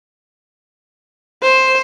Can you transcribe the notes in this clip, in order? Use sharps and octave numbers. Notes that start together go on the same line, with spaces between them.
C5